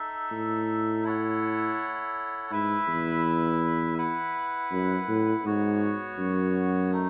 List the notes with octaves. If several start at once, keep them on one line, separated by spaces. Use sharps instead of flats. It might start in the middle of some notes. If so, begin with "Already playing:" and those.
Already playing: D#4 A4 E5
A2
E4 A4 C#5 F#5
G#2 E4 B4 E5
E2
E4 B4 F#5
F#2
A2
G#2 B3 F#4 C#5
F#2
A3 D#4